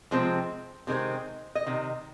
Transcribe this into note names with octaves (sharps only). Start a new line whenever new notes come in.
C3 F3 G#3 C4
C3 D#3 G#3 C4
D#5
C3 D#3